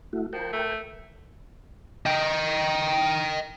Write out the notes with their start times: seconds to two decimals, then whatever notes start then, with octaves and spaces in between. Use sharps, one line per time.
0.13 A3 E4 F#4
0.33 F3 A#4 G5
0.53 A3
2.06 D#5 G5